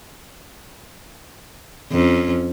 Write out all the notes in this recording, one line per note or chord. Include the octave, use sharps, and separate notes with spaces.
F2 C#4